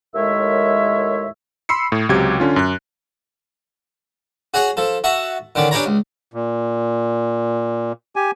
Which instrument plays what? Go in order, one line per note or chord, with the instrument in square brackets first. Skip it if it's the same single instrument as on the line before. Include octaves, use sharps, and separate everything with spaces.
[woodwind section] D#2 A2 G#3 A#4 C#5 E5
[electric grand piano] B5 C6 E6 C7 C#7
A2
C#2 C3 F#3 G4 G#6
D3 C#4 F4
F#2 F#6
[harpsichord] F#4 G#4 C#5 F#5
F3 A4
F#4 E5 F#5 A5
D3 D#3 C#4 D5
C#4 D4 G4 B4 C#5 A#5
C#2
[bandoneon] A#2
G4 G#5